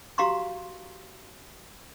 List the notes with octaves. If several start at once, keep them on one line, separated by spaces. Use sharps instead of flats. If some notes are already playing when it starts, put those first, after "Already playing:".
F#4 G4 F5 A#5 C6 C#6